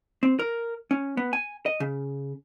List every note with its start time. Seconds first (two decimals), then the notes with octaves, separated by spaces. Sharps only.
0.23 C4
0.39 A#4
0.91 C#4
1.17 B3
1.33 G#5
1.66 D#5
1.80 C#3